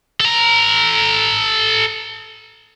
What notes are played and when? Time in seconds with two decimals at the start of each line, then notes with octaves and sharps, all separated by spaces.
0.20 A4 A#5